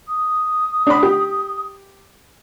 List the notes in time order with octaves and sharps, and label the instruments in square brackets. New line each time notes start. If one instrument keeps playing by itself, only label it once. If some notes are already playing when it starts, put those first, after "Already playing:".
[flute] D#6
[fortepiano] D4 B5
G4